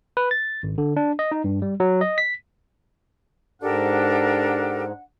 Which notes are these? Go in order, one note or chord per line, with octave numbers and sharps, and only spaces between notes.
B4
A6
G#1
D3
D4
D#5
D#4
G2
G3
F#3
D#5
B6
G#2 D4 G4 A4 A#4 F#5